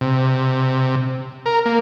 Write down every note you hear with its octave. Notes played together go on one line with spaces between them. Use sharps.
C3
A#4
A#3